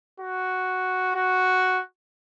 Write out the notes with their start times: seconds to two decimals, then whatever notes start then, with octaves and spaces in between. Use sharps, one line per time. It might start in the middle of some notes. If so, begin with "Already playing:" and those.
0.20 F#4
1.15 F#4